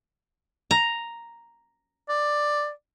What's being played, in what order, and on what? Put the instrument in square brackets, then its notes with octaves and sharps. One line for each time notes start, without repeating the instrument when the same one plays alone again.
[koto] A#5
[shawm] D5